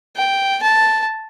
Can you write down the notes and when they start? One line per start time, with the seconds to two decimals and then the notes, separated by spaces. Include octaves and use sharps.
0.17 G5
0.63 A5